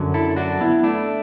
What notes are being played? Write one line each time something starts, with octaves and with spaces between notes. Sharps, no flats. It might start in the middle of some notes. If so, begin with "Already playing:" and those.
Already playing: F#2 D3 F#3
E4 A4
D4 F#4
B3 E4
A3 D4